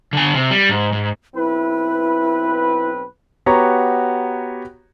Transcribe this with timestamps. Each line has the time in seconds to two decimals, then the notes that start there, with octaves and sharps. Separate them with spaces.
0.13 D3 G#5
0.34 C3
0.50 G3
0.69 G#2
0.92 G#2
1.35 B1 C4 E4 B4
3.46 B3 F#4 G4 C#5 A#5